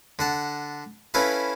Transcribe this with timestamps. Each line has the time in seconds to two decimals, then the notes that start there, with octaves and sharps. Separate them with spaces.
0.19 D3 F#5 A5
1.14 C#4 E4 A4 B4 F5